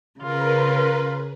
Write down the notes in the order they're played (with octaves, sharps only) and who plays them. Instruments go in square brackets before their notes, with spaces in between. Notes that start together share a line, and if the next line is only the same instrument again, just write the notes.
[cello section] C#3 [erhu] F4 [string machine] A#4 B4